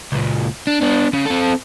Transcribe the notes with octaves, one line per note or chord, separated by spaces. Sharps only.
C#2 A#2
D4
B3 D4
C#3
C4 A4